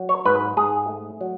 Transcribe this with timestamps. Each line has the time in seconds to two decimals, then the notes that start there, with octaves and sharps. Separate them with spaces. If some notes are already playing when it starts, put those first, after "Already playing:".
Already playing: F#3
0.09 C#5
0.25 G#2 B4
0.57 G#2 G#4
0.88 A3
1.21 F#3